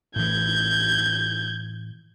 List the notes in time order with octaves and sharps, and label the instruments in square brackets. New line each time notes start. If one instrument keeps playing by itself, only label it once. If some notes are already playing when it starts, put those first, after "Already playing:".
[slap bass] A2 E3 [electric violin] G6 G#6